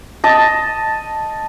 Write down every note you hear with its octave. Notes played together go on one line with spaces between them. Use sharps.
D#5 A5